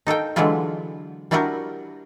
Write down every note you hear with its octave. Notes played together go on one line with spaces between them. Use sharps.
D#4 A4 F5 G5
D3 E3 F#3 G#3 E4 F4
G3 D4 E4 F#4 G4 A#4